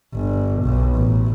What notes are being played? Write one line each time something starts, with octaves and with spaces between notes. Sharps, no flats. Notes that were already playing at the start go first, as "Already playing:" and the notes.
G1
B1
A1